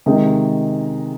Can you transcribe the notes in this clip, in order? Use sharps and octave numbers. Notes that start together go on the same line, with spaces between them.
C3 D#3 G#3